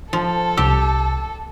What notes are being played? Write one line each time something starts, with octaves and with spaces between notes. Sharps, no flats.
F3 A4
C2 G4 E6